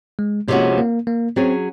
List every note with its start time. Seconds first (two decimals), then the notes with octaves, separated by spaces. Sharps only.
0.19 G#3
0.48 C3 F3 G#3 A#3 C#4 F#4
0.78 A#3
1.07 A#3
1.36 F#3 C4 C#4 G#4 C#5